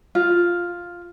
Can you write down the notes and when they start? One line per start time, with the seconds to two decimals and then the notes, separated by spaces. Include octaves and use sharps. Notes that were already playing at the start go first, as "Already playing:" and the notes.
0.15 F4